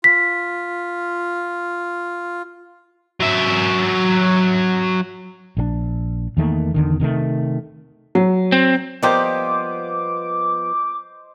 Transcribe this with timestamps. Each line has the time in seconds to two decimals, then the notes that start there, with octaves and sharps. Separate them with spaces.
0.04 F4 B6
3.20 F#3 E5
5.57 A#1 D3 D4
6.37 E2 D#3 A3 A#3
6.74 E2 D3 D#3
7.00 C3 D#3 F3 A3
8.15 F#3
8.52 C4
9.02 F3 G3 A#3 B3 G4 C5 D#5 D6